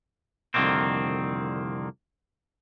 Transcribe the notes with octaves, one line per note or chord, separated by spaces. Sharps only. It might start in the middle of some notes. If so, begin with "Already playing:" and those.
C2 F2 D3 D#3 A#3 C4